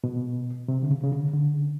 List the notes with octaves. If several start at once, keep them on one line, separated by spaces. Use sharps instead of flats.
B2
C3
D3
C#3
C#3
D3
D3